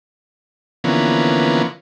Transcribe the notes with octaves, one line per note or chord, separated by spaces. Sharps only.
D3 E3 F3 A#3 B3 C#4